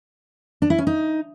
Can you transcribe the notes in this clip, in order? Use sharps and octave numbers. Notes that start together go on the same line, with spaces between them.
D4
E4
C#4
D#4